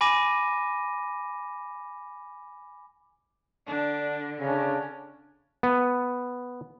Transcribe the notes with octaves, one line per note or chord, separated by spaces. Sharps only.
G#5 B5 D6 A#6 D#7
D3 D4
C#3 C#4 D4
B3